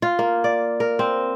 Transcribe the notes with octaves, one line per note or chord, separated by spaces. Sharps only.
F4
A#3
D5
A#4
C4